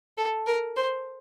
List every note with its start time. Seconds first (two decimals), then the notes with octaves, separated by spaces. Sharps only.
0.18 A4
0.46 A#4
0.76 C5